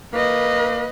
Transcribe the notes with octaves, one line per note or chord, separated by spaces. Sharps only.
A#3 B4 D#5